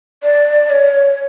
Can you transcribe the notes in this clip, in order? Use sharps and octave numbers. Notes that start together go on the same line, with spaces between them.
D5
C#5